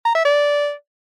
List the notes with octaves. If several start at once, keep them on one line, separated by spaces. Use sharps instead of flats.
A#5
E5
D5